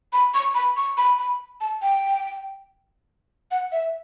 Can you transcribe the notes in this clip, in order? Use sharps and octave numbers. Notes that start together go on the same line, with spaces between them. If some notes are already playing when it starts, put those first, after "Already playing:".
B5
C#6
B5
C#6
B5
B5
A5
G5
F#5
E5